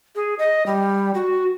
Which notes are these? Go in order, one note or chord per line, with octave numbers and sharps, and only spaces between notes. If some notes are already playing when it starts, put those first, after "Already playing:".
G#4
D#5
G3
F#4